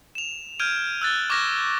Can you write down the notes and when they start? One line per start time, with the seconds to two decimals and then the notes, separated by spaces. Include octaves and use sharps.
0.15 E7 F7
0.59 F6 G6 G#6 D7 D#7 F7
1.01 E6 F#6 A6 G7
1.30 C#6 D6 F6 G#6 A#6 E7